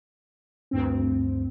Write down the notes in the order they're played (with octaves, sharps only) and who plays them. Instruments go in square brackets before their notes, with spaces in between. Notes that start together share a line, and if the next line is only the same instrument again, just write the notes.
[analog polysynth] D2 G2 C4